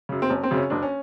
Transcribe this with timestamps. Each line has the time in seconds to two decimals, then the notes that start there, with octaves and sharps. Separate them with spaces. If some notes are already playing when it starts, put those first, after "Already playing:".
0.09 F#2 C#3
0.22 C4
0.29 F#1 C#4
0.43 C4
0.51 F#2 C#3
0.58 C#4
0.70 F#1 D4
0.83 C#4